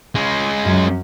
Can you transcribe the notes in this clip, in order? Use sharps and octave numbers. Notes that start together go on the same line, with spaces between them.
G#3 C#4
F#2